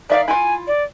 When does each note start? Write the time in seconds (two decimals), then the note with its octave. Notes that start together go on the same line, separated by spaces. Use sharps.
0.10 D#3 D5 E5 F5
0.28 E4 F4 G#5
0.67 D5